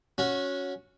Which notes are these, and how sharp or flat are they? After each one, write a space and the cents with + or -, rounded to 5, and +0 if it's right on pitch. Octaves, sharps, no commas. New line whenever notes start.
C#4 +0 F#4 -20